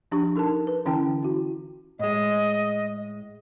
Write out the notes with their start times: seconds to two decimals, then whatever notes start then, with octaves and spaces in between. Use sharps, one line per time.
0.12 F3 D4 G4 C#6
0.36 D#4 A4 A#4 A5
0.67 B4
0.85 D3 E3 C#4 E4 G5 A5
1.23 E4 F#4
1.99 A2 G#3 D#5